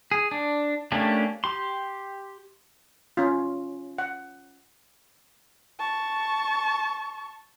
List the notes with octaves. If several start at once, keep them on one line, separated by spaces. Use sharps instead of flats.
G#4
D4
A3 A#3 C#4 D4 G4
G4 C6
C#4 F4
F#5
A5 C#6